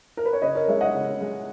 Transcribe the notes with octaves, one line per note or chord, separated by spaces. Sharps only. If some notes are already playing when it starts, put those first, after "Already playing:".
A#4
B4
C#5
C#3 B4 D#5
A#4 C#5
G#3 C#5 E5
D#5 F#5
C#3
G#3